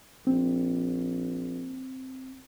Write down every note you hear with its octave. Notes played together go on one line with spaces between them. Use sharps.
A#1 C4